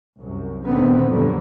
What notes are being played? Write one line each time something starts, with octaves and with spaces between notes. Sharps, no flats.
C2 F#2
D2 A#2 D3 D#3 B3 C4
F2 A#2 D3 F#3 G3